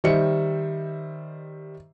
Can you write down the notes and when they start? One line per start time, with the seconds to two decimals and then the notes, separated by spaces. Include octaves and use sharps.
0.04 D#3 G3 C5 D#5 E5 C#7